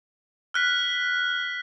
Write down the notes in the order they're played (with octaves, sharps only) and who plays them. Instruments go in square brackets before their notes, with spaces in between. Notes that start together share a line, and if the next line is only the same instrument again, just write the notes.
[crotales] F6 F#6 B6